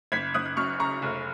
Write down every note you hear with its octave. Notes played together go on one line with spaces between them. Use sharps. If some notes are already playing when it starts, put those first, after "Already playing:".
F#1 G#6 B6
F#1 D#6 F#6
F#6
F#2 C#6 F6
C#3 A#5 C#6
F1